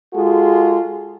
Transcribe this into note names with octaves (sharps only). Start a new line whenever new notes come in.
G#3 F4 F#4 G#4 A4